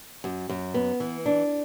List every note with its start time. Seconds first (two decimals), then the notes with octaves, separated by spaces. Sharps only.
0.24 F#2
0.49 F#2
0.74 B3
1.00 E3
1.26 D4